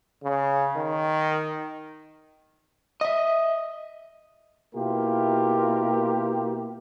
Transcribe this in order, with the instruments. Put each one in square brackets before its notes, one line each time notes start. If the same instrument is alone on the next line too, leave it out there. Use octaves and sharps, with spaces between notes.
[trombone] C#3
D#3
[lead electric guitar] D#5 E5
[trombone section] B2 A#3 E4 F4 G4 A#4